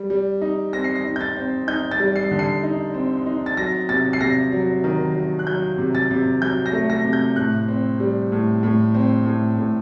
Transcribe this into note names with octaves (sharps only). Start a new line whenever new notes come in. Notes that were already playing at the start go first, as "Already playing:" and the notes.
Already playing: G3
G3
D#4
C4 A#6
C7
A#6
D#4
G6
A6
C4
D#4 G6
A6
G3
C7
D3
C7
D#4
C4
D#4
A6
F#3 A#6
C3 A6
C7
C3 A#6
F#3
D#3
F#3
F#6
F#3 G6
C3
A6
C3
F#3 G6
A#6
A3
A#6
C3
G6
A2 F#6
C4
G3
A2
A2
C4
A2
A2